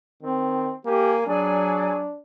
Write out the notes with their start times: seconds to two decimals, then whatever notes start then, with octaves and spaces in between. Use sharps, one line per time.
0.22 D#3 C4
0.85 A#3 G4 G#5
1.27 F#3 D4 G#4 D5 G#5